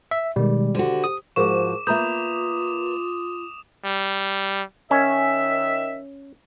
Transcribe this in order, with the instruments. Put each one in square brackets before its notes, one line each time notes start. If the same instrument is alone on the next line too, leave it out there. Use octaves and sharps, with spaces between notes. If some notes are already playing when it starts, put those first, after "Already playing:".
[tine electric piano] E5
[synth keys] B2 D#3 G#3 [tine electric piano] G3
[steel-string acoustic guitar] D3 F#4 [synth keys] G4 C5
[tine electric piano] D#6
[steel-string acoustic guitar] G#2 F3 F#4 [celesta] G#4 A#4 C#6 [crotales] D6 E7
[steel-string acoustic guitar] A#3 B4 [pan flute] F4 [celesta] E5 A#5 G6 [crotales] D#6
[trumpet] G3
[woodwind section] D#3 E5 [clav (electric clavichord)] C#4